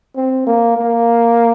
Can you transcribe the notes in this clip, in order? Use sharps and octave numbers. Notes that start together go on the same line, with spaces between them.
C4
A#3
A#3